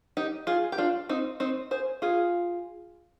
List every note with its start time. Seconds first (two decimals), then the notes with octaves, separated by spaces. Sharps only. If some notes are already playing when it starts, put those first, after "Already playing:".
0.17 D#4 G4
0.47 F4 G#4
0.72 G4
0.78 D4 F4
1.09 C4 D#4
1.40 C4 D#4
1.71 G#4 C5
2.02 F4 G#4